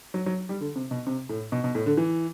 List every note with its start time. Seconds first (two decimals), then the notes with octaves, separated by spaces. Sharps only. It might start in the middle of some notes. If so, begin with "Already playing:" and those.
0.14 F#3
0.26 F#3
0.49 G3
0.60 D3
0.76 C3
0.91 B2
1.07 C3
1.29 A2
1.52 B2
1.64 B2
1.75 A2
1.86 D3
1.97 E3